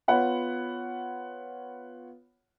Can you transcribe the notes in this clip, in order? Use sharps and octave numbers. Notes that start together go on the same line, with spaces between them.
B3 F4 C#5 F#5 B5